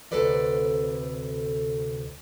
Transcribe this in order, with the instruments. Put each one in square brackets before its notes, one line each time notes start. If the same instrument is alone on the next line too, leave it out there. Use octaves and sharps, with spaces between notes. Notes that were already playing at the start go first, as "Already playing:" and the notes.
[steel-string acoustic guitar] D2 C3 A4 B4 D5 D#5